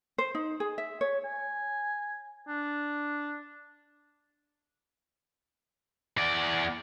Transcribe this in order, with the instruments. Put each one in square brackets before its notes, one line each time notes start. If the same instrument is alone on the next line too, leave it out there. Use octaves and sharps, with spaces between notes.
[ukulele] C5
D#4
G#4
E5
C#5
[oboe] G#5
D4
[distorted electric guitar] E2 D5